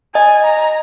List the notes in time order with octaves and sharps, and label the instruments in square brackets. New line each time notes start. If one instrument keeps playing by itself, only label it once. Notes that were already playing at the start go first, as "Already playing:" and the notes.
[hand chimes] D#5 [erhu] G#5
[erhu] A#5